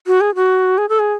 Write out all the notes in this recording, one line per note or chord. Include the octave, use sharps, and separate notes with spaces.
F#4
G#4
F#4
G#4
A4
G#4